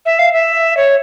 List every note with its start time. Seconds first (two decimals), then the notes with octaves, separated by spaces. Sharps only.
0.06 E5
0.19 F5
0.33 E5
0.77 C#5